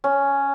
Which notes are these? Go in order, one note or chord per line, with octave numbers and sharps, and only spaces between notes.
C#4